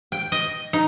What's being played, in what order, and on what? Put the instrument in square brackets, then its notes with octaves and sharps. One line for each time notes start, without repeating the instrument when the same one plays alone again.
[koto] G5
D#5
D#4